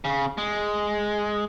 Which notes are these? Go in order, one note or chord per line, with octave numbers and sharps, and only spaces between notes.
C#3
G#3